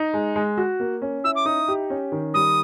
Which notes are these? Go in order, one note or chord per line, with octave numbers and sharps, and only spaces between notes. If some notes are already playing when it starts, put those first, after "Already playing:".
Already playing: D#4
G#3
G#3
F#4
A#3
C#4
E4 E6
D6
D#4 D#6
G4
C#4
D#3
G3 D#6